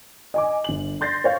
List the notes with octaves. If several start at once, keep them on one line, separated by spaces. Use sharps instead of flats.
D#5 G#5 D6
G1 F#7
C6 G6 A6 A#6 C7
C5 C#5 F5